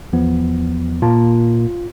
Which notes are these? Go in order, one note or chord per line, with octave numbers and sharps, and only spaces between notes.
E2 F3 B3
A#2 A#3 F4 A5